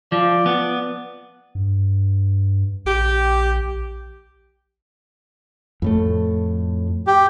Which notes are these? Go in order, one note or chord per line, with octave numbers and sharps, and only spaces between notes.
F3 D5
B3
G2
A#1 G4
F2 A2 A3
G4